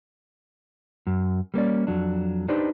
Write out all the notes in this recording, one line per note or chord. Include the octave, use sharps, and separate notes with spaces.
F#2
G3 A#3 C#4 D5
F2 F#3 D4
D4 D#4 G4 B4 C5 D5